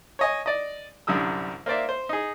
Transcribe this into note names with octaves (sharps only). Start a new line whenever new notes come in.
C#5 D#5 G#5
D5 D#5
C2 F#2 D3 G3 D#6 E6
A#3 C5 D5 E5
C5
D#4 G#4